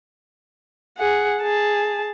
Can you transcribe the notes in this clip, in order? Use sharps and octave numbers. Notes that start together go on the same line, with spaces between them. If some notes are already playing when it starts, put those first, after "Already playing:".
G#4 F#5
G#4 A5